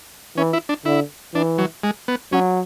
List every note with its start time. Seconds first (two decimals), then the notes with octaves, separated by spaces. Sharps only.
0.37 E3 C#4
0.53 E4
0.69 D4
0.85 D3 E4
1.34 E3 D4
1.58 F#3
1.83 G#3
2.08 B3
2.32 F#3 C#4